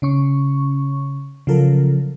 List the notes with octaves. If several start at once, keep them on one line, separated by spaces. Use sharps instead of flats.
C#3 C#4 C#6
C#3 F3 F#3 F4 A4 A#4